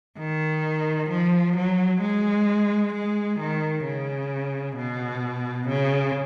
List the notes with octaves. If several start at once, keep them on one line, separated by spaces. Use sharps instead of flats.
D#3
F3
F#3
G#3
G#3
D#3
C#3
B2
C#3